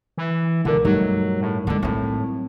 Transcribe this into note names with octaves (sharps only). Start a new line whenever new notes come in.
E3
C#2 B2 D3 A#4
G2 F#3 G3 A3 D#4
A2
D3 G#3 C#4
A2 F#3 C4